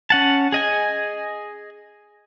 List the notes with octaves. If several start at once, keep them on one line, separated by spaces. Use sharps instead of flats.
C#4 F#5 A5
G#4 D#5 G#5